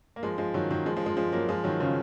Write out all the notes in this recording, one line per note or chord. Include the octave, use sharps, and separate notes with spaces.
A#3
F3 G#3
F3 G#3
D#3 F#3
D#3 F#3
F3 G#3
F3 G#3
F3 G#3
F3 G#3
F#3 A#3
F3 G#3
D#3 F#3
C#3 F3